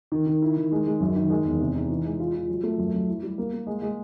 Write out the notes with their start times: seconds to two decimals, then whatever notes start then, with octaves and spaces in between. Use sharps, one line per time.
0.12 D#3
0.26 D#3
0.42 E4
0.57 D#3
0.72 G#3
0.87 G#3
1.00 F#2
1.16 D#3
1.30 G#3
1.45 E2
1.60 C3
1.75 D#4
1.89 E3
2.05 G#3
2.19 F4
2.35 F4
2.48 F#3
2.63 A3
2.78 F#2
2.94 F#2
3.07 E4
3.23 G3
3.38 A#3
3.53 A#3
3.67 G#3
3.82 G#3